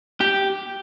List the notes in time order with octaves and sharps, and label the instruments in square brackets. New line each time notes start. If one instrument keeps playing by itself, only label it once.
[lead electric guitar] G4